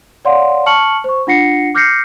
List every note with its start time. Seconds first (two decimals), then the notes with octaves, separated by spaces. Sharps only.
0.25 C#5 D5 F5 F#5 C6
0.66 A5 C#6 F6 C#7 F#7
1.04 C5 C#6
1.27 D4 F4 F#5 A#6 C7 C#7
1.75 D6 F6 G6 A#6 C7 C#7